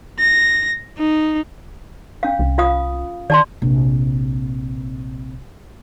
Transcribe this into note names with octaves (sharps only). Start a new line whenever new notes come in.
A#6
D#4
C#4 F5
C2
F4 F5 D#6
D#3 D5 A5 C6
A#1 C3